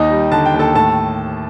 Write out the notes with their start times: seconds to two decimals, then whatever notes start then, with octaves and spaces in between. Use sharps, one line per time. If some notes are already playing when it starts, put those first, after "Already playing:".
Already playing: D#2 D#4 D#5
0.11 G3
0.32 D3 A5
0.46 G5
0.54 D#2
0.59 A4 A5
0.74 A2 A4 A5